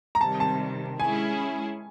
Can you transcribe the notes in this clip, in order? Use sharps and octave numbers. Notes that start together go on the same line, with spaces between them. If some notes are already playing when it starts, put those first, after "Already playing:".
A#5
C3 D#3 G3 A5
A5
G#3 C#4 E4 G#4 G#5